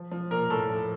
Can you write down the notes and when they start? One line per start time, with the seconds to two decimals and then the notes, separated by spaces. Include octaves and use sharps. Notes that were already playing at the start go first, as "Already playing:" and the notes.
Already playing: F3
0.11 F3
0.31 A#2 A#4
0.50 A2 A4
0.70 F3